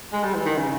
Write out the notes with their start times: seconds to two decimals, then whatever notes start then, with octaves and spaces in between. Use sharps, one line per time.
0.12 G#3
0.24 G3
0.35 E3
0.46 D#3
0.57 C#3